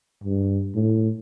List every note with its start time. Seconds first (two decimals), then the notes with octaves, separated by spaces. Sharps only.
0.24 G2
0.75 A2